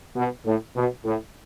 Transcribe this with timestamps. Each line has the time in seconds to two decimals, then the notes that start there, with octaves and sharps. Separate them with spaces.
0.16 B2
0.45 A2
0.76 B2
1.05 A2